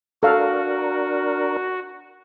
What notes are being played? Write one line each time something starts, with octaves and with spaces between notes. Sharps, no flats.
D4 F#4 A4 A#4 F5